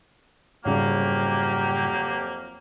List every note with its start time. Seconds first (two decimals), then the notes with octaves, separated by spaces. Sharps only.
0.66 F2 G#2 C#3 F#3 G3 A#3 G4